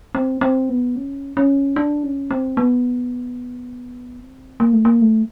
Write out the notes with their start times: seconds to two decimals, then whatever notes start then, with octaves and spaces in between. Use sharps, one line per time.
0.15 C4
0.41 C4
0.69 B3
0.96 C#4
1.37 C#4
1.76 D4
2.04 C#4
2.31 C4
2.57 B3
4.20 C4
4.60 A#3
4.73 A3
4.85 A#3
5.01 A3